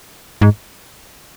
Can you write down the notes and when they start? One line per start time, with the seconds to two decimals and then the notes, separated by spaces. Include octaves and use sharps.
0.41 G#2